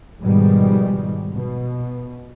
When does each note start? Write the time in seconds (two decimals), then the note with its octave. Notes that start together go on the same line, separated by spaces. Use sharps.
0.20 G#2 B2 D#3 F3 G3 G#3
1.34 B2